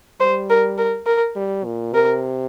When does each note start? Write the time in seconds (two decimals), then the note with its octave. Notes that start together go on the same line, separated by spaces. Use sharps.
0.20 G3 C5
0.50 A#4
0.78 A#4
1.06 A#4
1.36 G3
1.65 A#2
1.93 C3 A#4